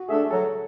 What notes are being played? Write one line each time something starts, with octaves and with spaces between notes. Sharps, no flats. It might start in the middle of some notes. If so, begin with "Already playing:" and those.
Already playing: F#4
A3 D4 G#4 A4 E5
F#3 A4